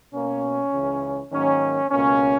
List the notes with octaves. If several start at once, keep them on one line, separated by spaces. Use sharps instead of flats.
B2 A#3 C#4
C#2 C#3 E3
G#2 D#3 F#3 A#3 C#4
C#2 B2 A#3 C#4